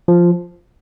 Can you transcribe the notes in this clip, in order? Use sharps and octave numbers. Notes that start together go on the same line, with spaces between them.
F3